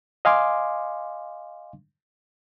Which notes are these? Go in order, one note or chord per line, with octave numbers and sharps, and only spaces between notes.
D#5 F5 G#5 C6 D6